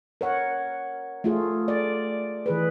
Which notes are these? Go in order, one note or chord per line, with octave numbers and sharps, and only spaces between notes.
A#4 C#5 F#5
A3 F4 G#4
D5
E3 G#4 B4